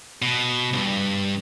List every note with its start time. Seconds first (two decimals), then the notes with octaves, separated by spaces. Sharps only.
0.22 B2
0.73 C2 G2